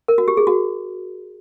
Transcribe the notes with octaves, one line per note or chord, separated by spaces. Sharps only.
A#4
F#4
G4
G#4
F#4